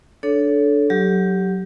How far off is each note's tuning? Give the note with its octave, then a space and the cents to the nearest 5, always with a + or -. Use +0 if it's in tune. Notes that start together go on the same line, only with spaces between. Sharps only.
D4 +0 A4 -10 C#5 +25
F#3 +0 G4 +0